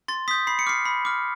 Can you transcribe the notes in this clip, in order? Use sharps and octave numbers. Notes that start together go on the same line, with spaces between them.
C6 A6
D#6 G6 B6
B5 C7
C#7
D6 F6 C7
B5
D6 F6